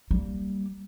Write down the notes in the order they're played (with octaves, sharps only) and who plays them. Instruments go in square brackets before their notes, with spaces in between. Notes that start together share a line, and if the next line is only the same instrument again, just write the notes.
[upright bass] G3 A#3